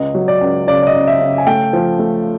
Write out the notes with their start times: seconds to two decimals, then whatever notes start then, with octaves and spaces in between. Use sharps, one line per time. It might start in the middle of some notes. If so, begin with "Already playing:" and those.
Already playing: C#2 D#5
0.15 F#3
0.28 D5
0.41 C#2
0.67 C#3 D5
0.83 D5
0.87 D#5
0.94 C#3
1.08 E5
1.21 C#3
1.38 G#5
1.46 A3 G5
1.73 F3
1.99 A3